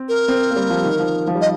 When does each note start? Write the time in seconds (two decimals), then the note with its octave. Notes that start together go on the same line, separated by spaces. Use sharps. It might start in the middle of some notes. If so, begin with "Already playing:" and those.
Already playing: C4
0.09 A#4
0.28 C4
0.51 A#3
0.56 G3
0.70 F3
0.84 D#3
0.99 F3
1.28 F3
1.35 G3
1.41 D#5